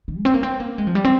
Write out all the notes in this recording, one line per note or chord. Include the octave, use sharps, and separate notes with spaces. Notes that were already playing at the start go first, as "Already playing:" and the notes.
D3
G#3
C4
A#3
C4
A#3
G#3
F3
G3
C4